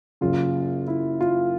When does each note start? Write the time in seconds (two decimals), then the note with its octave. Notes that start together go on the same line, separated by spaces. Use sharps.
0.21 F#1 F#2 C#3 F4
0.88 E4
1.21 F4